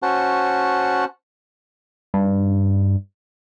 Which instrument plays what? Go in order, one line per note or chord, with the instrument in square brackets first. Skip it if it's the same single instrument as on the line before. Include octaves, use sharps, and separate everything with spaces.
[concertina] C#4 F#4 C5 F#5 A5
[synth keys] G2